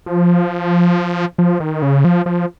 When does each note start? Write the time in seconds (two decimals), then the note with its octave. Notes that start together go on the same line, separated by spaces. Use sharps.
0.06 F3
1.39 F3
1.60 D#3
1.82 C#3
2.05 F3
2.26 F3